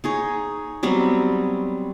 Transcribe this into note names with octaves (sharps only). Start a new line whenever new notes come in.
D#4 G#4 C#5
F#3 G3 B3 C4